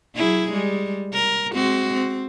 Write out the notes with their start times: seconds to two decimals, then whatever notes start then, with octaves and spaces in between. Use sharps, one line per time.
0.16 F#3 E4 G#4
0.52 G3 G#3
1.14 A#4
1.55 G#3 C4 F#4
1.94 C4